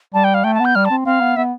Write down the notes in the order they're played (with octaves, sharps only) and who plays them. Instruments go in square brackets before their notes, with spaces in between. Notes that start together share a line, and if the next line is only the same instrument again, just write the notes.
[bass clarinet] G3 [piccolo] A5
[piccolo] G5
F5
[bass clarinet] A3 [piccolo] G5
[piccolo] A5
[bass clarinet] B3
[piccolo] G6
[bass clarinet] G3 [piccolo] F6
[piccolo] A5
[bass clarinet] C4
[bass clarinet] C4 [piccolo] F5
[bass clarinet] B3
[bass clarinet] B3 [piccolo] E5